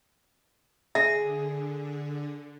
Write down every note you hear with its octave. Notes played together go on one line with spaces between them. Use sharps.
D3 G#4 E5